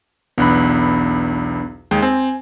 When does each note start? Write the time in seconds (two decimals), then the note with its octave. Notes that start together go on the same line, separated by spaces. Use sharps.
0.38 B1 E2 B3 D4 B5 F#6
1.91 D#2 G#3 G5
2.02 C4 G#5